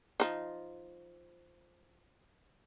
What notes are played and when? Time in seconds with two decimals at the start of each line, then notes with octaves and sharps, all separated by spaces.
0.20 F3 D#4